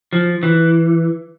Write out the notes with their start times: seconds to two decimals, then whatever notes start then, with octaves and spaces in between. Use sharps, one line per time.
0.13 F3
0.43 E3